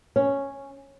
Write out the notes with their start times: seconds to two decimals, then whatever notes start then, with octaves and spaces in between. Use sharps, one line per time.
0.16 C#4